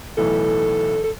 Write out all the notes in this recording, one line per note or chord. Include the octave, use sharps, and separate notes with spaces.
B1 A2 E3 A4
A4